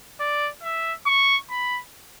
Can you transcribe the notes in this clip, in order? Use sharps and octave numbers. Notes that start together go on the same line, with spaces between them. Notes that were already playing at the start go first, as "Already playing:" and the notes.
D5
E5
C#6
B5